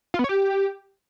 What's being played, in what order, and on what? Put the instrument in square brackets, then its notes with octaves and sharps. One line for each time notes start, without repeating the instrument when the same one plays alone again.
[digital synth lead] F4
B3
C#5
G4